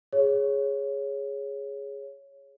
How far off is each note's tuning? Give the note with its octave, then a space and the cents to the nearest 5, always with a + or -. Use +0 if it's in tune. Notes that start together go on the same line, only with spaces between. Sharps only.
G#4 +0 C#5 +0